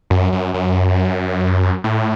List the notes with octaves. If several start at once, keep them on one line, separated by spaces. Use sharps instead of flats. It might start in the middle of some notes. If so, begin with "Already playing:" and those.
F#2
F#2
F#2
A2